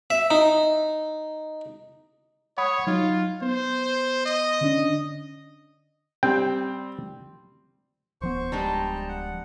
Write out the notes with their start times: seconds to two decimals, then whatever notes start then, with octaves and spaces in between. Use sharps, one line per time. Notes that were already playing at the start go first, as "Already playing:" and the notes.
0.10 E5
0.31 D#4
2.58 C#5 F#5 B5 D#6
2.87 F#3 D#4 F4
3.42 B3 C5
4.26 D#5
4.61 D3 C#4 D4
6.23 G3 C4 G5
8.21 D1 F3 B3 C5 C#6
8.52 G3 G#3 D4 G5 A5 A#5
9.09 F#5